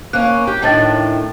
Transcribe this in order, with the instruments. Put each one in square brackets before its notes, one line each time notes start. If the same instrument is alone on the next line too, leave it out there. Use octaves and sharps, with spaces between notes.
[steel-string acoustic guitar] A#3 C#4 [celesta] F#6
[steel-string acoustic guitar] G4
[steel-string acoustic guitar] A2 D#3 D4 [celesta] G5 A5 A6